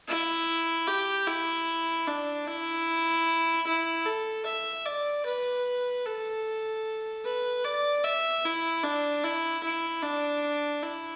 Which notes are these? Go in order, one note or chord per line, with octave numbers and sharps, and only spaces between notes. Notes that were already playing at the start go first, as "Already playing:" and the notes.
E4
G4
E4
D4
E4
E4
A4
E5
D5
B4
A4
B4
D5
E5
E4
D4
E4
E4
D4
E4